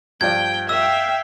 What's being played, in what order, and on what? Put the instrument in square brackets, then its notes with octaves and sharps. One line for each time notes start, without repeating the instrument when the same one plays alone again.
[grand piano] G2 F3 D5 [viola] G5 [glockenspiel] G#6
[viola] E5 F5 [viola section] G5 [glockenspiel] E6